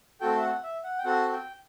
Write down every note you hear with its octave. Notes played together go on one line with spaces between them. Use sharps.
A3 C4 F#4 A4 G5
E5
F#5
E5
F#5
G5
C4 F#4 A4 F#5
G5